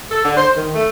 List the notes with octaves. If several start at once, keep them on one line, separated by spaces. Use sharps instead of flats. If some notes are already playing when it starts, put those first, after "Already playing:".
A4
D3
C5
D#3
A3